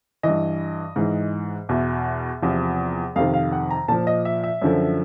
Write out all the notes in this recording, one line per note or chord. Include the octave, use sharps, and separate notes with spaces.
G2 E3 D#5
G#2 E3
E2 B2 E5
E2 C3 F3
F2 C3 D#3 F5
F5
F#5
A#5
A#2 F3 A5
D#5
E5
E5
F#2 D3 F3